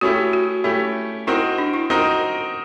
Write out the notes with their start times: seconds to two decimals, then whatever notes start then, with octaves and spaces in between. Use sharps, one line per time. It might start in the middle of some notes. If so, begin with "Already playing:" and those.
0.01 A3 C#4 E4 F#4 G4
0.33 F#4
0.64 A3 C#4 E4 G4
1.27 C4 D#4 E4 F#4 A#4
1.58 D4
1.73 E4
1.90 C4 D#4 F#4 A#4